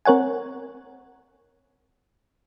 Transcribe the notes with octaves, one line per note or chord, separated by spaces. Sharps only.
C4 A#4 C#5 F#5 G#5